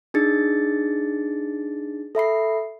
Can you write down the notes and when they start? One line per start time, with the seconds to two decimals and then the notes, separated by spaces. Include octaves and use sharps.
0.14 D4 D#4 G#4 A6 C#7
2.15 A4 E5 B5 C7